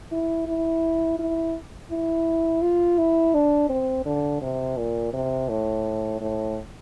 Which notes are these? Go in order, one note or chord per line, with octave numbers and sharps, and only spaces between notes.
E4
E4
E4
E4
F4
E4
D4
C4
D3
C3
A#2
C3
A2
A2